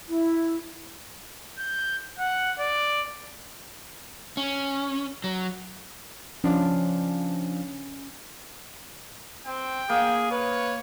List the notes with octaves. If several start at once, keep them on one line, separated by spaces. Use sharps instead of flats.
E4
G6
F#5
D5
C#4
F#3
F3 C#4 D4 F5
C4 G5
A#3 G#4
B4 C#5